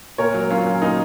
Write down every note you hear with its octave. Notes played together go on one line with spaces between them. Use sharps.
A#2 A#4 C#5
F#3
F#3 C#4 F4
F#3
A#2 D#4